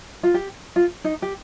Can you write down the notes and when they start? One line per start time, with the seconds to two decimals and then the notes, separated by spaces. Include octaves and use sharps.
0.23 F4
0.34 G4
0.76 F4
1.04 D#4
1.22 G4